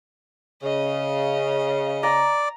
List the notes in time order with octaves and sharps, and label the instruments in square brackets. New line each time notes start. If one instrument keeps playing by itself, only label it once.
[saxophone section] C#3 [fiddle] D#5
[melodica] D5 [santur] A#5